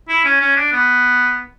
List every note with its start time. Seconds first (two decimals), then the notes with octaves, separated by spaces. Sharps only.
0.09 E4
0.25 C#4
0.41 C#4
0.57 D4
0.73 B3